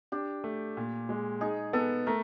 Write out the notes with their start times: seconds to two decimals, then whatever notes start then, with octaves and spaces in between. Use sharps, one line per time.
0.12 D4 G4
0.44 A3
0.77 A#2
1.09 G#3
1.41 D#4 G#4
1.73 B3 A4
2.06 A3 A#4